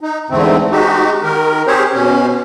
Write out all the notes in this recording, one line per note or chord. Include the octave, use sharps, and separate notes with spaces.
D#4
E2 G#2 D3 A3 C4
G#3 D#4 F#4 G4
D#3 A#4
C4 G4 G#4 C5 C#5
B2 C#4